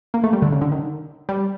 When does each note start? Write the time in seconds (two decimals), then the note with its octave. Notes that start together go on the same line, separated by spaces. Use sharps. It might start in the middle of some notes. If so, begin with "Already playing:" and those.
0.14 A#3
0.24 A3
0.33 G3
0.42 D3
0.52 C#3
0.61 D3
0.72 D#3
1.29 G3